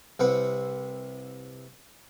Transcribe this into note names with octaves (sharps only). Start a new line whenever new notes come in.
C2 C4 B4 F#5